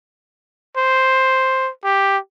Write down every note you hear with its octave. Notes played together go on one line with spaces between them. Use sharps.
C5
G4